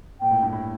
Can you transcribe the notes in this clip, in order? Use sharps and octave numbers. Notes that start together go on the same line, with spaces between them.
A#2 G5
A2
G2
A2